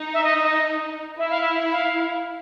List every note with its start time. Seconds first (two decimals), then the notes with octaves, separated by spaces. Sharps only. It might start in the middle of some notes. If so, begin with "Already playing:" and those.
Already playing: D#4
0.14 E5
0.24 D#5
0.43 D#5
1.19 E4 E5
1.30 F5
1.41 E5
1.72 F5